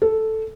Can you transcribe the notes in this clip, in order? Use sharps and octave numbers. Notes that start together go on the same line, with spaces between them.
A4